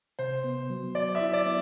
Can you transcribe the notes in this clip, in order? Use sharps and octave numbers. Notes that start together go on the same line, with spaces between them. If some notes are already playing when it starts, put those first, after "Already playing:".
C3 C5
B3
F#3
F#3 D5
E5
E4
D5
B3